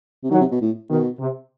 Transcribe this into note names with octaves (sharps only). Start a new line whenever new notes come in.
C3
D#3 F#3
C3
B2
A2
B2 D#3
C3